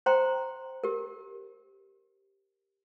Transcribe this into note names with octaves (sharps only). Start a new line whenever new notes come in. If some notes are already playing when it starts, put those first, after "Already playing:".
C5 G5 A#5 C6
G4 A#4